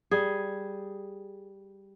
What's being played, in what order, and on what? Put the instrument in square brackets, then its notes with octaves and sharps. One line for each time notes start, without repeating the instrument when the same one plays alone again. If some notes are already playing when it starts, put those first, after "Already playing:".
[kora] G3 G#4